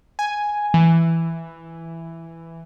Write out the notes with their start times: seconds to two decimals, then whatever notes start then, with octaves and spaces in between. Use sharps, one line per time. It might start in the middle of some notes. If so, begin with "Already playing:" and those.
0.19 G#5
0.74 E3